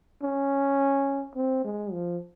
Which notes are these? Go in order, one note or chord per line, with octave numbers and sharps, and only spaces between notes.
C#4
C4
G#3
F3